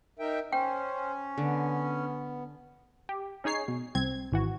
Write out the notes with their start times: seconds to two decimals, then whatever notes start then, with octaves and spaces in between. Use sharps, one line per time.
0.19 D#4 A#4 E5 G5
0.52 C#4 C5 G5
1.38 D3 B3
3.09 G4
3.44 C#4 D#4 G#4 C#5 C7
3.68 B2
3.95 C2 C4 G#6
4.32 G#1 E3 F#4